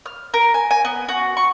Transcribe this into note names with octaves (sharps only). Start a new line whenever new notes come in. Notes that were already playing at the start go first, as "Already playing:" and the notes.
F6
A#4
G#5
G#5
B3
F#4
C#6